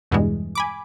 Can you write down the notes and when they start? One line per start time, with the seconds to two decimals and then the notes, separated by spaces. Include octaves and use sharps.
0.11 E2 G2 B2 E3 G#3
0.55 G#5 B5 D6